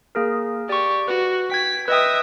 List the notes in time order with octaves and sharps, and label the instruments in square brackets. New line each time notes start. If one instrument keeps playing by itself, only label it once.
[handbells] A#3 G#4 A#4
[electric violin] G4 [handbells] D5 C#6
[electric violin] F#4 [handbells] B4
[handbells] G5 G#6 [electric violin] B6
[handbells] B4 D#5 G5 [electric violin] E5 D#6